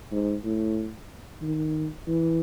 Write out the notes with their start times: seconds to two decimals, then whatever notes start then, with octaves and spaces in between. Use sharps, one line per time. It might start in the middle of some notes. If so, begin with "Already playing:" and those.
0.12 G#2
0.44 A2
1.42 D#3
2.08 E3